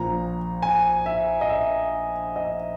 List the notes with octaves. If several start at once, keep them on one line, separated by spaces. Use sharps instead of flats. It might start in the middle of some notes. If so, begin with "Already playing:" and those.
Already playing: A#1 A#2 A#5
G#5
E5
D#5
E5
D#5